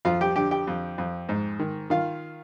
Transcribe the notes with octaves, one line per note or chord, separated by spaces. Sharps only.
F2 F4 F5
G4 G5
D3 G4 G5
G4 G5
F2
F2
G#2
D#3
D#3 F4 F5